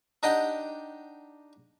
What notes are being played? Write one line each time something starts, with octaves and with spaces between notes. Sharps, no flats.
D4 D#4 G4 D#5 F#5 G5